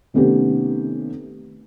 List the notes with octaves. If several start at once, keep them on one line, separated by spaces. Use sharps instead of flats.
C3 D#3 A3 B3 C#4 G4